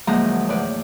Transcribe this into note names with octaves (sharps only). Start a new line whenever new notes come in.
D2 F3 F#3 G#3 A#3 A#5
E2 A2 B4 D5